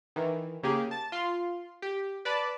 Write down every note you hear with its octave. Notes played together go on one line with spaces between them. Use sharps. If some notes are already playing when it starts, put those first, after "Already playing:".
D#3 E3
C#3 A#3 G4 G#4
A5 A6
F4 C6
G4
B4 D5 A5 B5